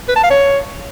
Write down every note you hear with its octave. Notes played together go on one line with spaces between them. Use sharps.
B4
A5
F5
C#5